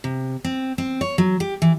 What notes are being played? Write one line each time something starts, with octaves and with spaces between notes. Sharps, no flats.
C3
C4
C4
C#5
F#3
G4
E3